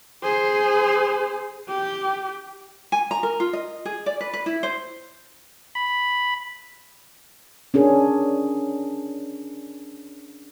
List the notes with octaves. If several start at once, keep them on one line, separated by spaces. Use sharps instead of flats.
G#4 C5
G4
G#5
A#5
A#4
F4
D#5
G#4
D5
B4
B4
E4
C5
B5
C#4 D4 G#4 A#4